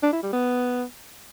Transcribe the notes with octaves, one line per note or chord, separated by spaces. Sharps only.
D4
E4
G3
B3